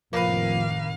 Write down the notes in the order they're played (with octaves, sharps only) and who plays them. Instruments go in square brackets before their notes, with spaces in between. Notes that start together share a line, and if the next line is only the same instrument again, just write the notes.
[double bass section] F1 A2 D#3 [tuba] F3 [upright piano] A#3 B4 [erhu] F5